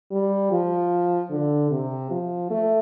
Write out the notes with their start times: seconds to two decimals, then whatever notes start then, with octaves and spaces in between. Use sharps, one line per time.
0.11 G3
0.51 F3
1.31 D3
1.71 C3
2.10 F3
2.50 A3